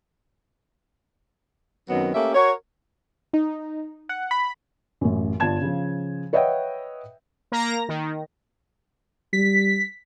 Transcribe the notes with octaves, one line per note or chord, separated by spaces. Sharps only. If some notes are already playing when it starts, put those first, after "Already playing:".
F#2 D#3 F#3 B3 C4
A3 A#3 C#4 G4 E5
F#4 A#4 C#5
D#4
F#5
B5
A1 F#2
G1 F4 D5 A5 G#6 E7
C#3 F3
B4 C#5 D#5 E5 F#5 G5
A#3 A#5 A#6
D#3
G3 B6